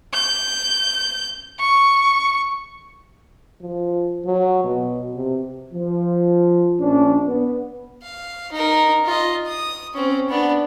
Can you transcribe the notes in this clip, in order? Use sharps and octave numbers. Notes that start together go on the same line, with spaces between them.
G6
C#6
F3
F#3
B2
C3
F3
A#1 C#4 D4
B3
F5
D#4 A#4
F4 D#5
D#6
C4 C#4
B3 D4